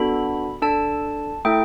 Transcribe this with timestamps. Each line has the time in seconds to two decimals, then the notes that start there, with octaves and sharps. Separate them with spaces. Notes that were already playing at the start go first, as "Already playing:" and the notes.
Already playing: B3 D4 F#4 A4 B5
0.62 D4 A4 A5
1.45 A3 E4 A4 G5